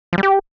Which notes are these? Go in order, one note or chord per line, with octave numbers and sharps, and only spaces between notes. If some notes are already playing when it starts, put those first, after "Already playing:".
F3
G3
G4